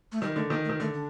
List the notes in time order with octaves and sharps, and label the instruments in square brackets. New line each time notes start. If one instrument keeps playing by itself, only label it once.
[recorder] A3
[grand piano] D#3 [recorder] G3
[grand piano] D3 [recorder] A3
[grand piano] D#3 [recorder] A#3
[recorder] A3
[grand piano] D#3
[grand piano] D3 [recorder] A3
[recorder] D4